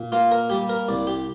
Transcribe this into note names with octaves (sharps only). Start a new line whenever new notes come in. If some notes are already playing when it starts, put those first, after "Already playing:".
Already playing: A#2
A#3 F4
A#4
G3 G4
A#4
C2 D5
G4